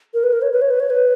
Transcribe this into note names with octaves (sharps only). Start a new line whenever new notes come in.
A#4
B4
A#4
C#5
B4
C#5
B4
C#5
B4